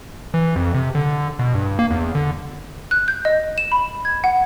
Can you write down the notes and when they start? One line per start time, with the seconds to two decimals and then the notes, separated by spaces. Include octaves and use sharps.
0.34 E3
0.56 F2
0.74 C3
0.95 D3
1.39 B2
1.55 G2
1.79 A#3
1.90 E2
2.15 D3
2.91 F#6
3.08 G6
3.25 D#5
3.58 E7
3.72 B5
4.05 G#6
4.24 F#5